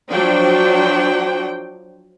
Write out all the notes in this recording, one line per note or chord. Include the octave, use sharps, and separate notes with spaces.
F3 F#3 D4 C5 G5